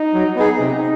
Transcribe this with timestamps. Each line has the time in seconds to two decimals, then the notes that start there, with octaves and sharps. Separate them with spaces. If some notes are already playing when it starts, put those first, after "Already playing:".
Already playing: D#4
0.14 F#3
0.36 B3 D#4 G#4
0.59 C3 D#4